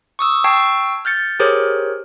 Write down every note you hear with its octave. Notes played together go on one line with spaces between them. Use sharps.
C#6 D#6 E6
G5 A5 C#6 E6 G#6 C7
F6 G6 A6 C#7
G4 G#4 A#4 C5 C#5